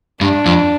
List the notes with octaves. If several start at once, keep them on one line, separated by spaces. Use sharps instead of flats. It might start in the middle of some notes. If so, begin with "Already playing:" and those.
G2 D4
F2